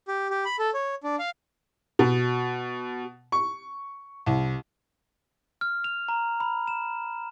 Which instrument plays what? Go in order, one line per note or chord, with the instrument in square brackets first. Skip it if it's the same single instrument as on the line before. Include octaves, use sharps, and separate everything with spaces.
[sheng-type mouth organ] G4
G4
B5
A4
C#5
D4
F5
[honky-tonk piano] B2
C#6
C2
[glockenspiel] F6
F7
A#5
B5
E7